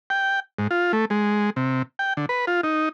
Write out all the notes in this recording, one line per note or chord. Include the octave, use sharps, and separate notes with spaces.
G5
G#2
F4
A3
G#3
C3
G5
D3
B4
F4
D#4